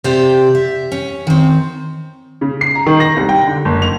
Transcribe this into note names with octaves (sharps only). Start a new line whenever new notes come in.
C3 G4 C5 D5 G5
E5
C#4
D#3 C4
C#3
C7
A#5
D#3
A#6
C2
G5
D3
F#1
F7